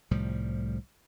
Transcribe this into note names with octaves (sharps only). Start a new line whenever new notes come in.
C2 A2 F3 G3